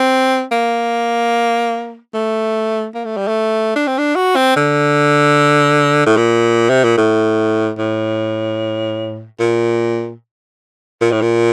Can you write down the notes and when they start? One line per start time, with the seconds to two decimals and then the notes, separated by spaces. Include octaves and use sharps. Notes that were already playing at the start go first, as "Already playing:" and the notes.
Already playing: C4
0.52 A#3
2.14 A3
2.95 A#3
3.05 A3
3.17 G3
3.28 A3
3.76 D4
3.87 C4
3.98 D4
4.16 F#4
4.36 C4
4.56 D3
6.06 A2
6.17 A#2
6.69 C3
6.84 A#2
6.98 A2
7.78 A2
9.40 A#2
11.01 A#2
11.12 A2
11.22 A#2